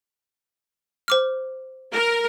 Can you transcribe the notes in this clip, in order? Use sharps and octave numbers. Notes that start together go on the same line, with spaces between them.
C5 D6 F6
A#4